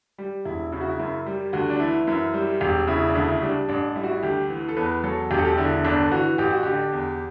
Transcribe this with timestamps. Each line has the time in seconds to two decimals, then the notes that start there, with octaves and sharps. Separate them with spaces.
0.18 G3
0.45 E1 E4
0.72 C#3 E4
0.81 F#4
0.89 E4
0.99 F#2 E4
1.26 G3
1.53 D2 F#4
1.70 D4
1.80 E3 E4
2.07 F#2 E4
2.34 G3
2.61 E1 G4
2.87 C#3 E4
3.08 D4
3.15 D2 E4
3.32 E4
3.42 G3 D4
3.69 A1 D4
3.96 G3 E4
4.04 F#4
4.11 E4
4.23 D2 G4
4.50 E3
4.69 A4
4.77 E2 B4
5.04 F#3 A4
5.31 E1 G4
5.38 A4
5.45 G4
5.58 D3 E4
5.84 G1 D4
6.11 E3 F#4
6.38 A1 G4
6.51 F#4
6.63 D3 G4
6.93 E2